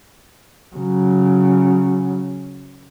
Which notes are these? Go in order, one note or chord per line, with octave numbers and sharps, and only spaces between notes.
C#3 F#3